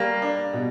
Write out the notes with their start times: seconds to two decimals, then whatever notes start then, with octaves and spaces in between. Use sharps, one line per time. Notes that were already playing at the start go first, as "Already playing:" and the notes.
Already playing: G3 A#3
0.22 D4
0.53 B2